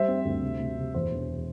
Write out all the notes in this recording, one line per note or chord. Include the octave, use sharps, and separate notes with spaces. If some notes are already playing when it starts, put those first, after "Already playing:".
Already playing: G3 C5 E5
C4
D2
C3
C3
C3
E2 C5
E1